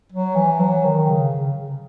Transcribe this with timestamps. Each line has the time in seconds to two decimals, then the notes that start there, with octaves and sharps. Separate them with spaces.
0.12 F#3
0.36 E3
0.60 F#3
0.85 D#3
1.09 C#3
1.32 C#3
1.57 C#3